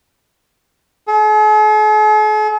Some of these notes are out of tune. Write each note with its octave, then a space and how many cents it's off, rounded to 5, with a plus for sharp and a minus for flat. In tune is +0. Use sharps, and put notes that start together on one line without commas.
G#4 +45